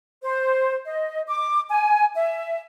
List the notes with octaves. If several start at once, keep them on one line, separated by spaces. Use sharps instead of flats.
C5
D#5
D6
G#5
E5